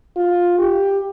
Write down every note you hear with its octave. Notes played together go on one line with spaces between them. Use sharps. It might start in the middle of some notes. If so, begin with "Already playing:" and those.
F4
G4